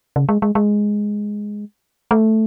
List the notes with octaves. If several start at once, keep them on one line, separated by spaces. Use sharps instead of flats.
C#3
G#3
G#3
G#3
A3